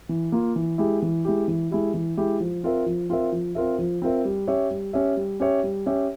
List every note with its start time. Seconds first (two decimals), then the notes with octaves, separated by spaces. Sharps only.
0.09 E3
0.32 A#3 F4
0.56 E3
0.78 G#3 E4 G4
1.02 E3
1.25 G#3 E4 G4
1.48 E3
1.71 G#3 E4 G4
1.94 E3
2.17 G#3 E4 G4
2.40 F3
2.63 C4 F4 A#4 E5
2.86 F3
3.09 C4 F4 A#4 E5
3.32 F3
3.55 C4 F4 A#4 E5
3.78 F3
4.02 C4 F4 A#4 E5
4.25 G3
4.47 C#4 G4 C#5 E5
4.71 G3
4.93 C#4 G4 C#5 E5
5.17 G3
5.40 C#4 G4 C#5 E5
5.63 G3
5.86 C#4 G4 C#5 E5